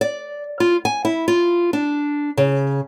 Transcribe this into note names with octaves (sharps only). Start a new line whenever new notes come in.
D5
F4
G#5
E4
F4
D4
C#3